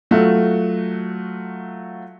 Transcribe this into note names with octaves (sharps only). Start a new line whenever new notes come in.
F#3 A3 F4 F#4